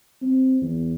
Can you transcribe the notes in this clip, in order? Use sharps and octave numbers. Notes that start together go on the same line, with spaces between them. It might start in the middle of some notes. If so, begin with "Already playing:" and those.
C4
E2